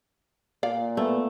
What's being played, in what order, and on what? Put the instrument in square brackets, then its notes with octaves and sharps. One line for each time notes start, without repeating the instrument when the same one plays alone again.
[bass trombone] A#2 [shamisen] D5 F5
[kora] A3 [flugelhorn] B3